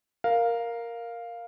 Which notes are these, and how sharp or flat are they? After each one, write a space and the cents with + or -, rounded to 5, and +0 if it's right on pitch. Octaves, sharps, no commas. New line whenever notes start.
A#4 +0 F5 +0